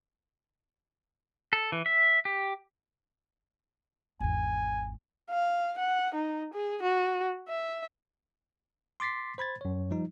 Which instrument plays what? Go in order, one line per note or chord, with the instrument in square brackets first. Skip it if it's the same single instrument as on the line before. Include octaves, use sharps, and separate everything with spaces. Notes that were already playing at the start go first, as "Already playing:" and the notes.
[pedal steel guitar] A4
E3
E5
G4
[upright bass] G#1 E2 [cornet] G#5
[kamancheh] F5
F#5
D#4
G#4
F#4
E5
[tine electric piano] C6 D6 A6 B6 C7
C5 B5 G#6 A6
F#2 C#5
F3 G3 D#4